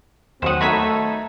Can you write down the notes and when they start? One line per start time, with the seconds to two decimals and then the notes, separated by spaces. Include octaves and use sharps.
0.42 D#2 F#3 C4 C5 F#5 D#6
0.61 A3 D#4 F#4 C#5 B5 E6 B6